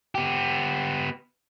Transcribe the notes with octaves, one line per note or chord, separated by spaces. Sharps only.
B3 G4